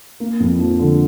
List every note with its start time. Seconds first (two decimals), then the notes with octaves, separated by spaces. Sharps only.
0.20 A#3
0.40 F2
0.59 F3
0.79 D3